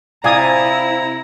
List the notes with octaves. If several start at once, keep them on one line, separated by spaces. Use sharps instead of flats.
C3 E4 F4 D5 G#5 A#5 D#6